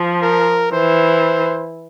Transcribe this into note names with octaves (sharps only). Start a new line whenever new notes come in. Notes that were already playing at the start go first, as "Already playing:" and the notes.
Already playing: F3
A#4
E3 C5